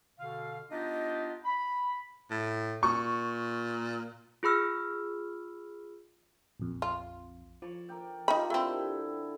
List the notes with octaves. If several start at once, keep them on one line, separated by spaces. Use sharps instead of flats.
B2 D3 F5
B3 D4 D#4 F4 G4 D#5
B5
A2
A#2 C#6
F4 G#4 B5 E6 F6
A#1 F2
F4
F3 C#5 D5
A#4 D5 G5
D#4 F4 G4 A#4 G5 B5
D3 A3 C4 E4 A4